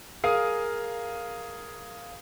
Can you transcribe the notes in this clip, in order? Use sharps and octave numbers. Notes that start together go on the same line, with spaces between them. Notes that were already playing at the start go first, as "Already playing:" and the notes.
G#4 A#4 F5 G#5 D#6